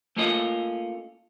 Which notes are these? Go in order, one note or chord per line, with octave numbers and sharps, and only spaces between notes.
A3 A#3 C#4 F4 D#5